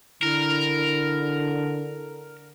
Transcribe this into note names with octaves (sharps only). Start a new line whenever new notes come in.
D3 E4 A#4